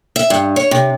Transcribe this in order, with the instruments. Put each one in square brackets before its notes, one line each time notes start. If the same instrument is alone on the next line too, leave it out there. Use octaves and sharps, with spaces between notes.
[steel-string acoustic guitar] E5
G2
C#5
C3